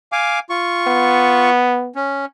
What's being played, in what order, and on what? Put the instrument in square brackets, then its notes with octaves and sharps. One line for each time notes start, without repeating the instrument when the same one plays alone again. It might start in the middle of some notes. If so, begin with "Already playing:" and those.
[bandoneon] F5 G#5 D6
F4 C#6
[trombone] B3
[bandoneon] C#4